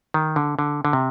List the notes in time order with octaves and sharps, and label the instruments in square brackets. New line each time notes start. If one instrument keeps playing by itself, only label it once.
[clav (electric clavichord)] D#3
D3
D3
D3
C3